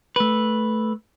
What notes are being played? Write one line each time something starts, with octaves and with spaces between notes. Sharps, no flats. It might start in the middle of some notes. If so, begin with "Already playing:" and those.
A3 B4